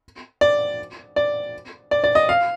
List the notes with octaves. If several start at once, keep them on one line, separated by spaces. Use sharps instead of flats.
D5
D5
D5
D5
D#5
F5